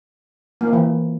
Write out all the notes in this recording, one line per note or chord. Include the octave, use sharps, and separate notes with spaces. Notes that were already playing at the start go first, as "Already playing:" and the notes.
A#3
C4
E3